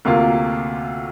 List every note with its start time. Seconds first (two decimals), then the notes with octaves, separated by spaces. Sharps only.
0.05 D2 C3 A#3 F4